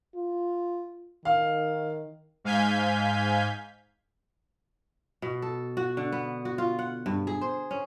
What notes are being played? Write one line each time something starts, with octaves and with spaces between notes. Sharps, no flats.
F4
D#3 F5
G#2 F5 G#5 G6 G#6 B6
B2
A4
F#4
D3
B3
F#4
F4
F#5
G2
G#4
C5
C#4